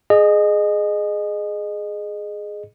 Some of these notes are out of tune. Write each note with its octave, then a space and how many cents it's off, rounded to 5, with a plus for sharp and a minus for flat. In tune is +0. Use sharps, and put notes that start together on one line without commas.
G#4 +10 D#5 -25